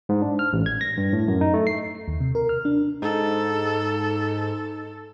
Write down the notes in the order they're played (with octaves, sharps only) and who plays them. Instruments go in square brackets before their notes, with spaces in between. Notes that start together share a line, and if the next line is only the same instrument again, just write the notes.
[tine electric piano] G#2
D4
F6
A1
G#6
A#6
G2
A2
F#2
D#4
A3
C7
[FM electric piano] D#2
C3
A#4
F6
D4
[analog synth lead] G#2 [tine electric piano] D#4 [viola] A4